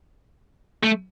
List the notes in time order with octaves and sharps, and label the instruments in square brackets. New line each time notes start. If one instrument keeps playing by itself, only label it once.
[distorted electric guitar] A3